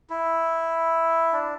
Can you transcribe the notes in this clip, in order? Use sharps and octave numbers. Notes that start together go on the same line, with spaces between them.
E4
D4